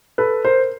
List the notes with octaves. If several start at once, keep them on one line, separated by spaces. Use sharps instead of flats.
A4 B4
A#4 C5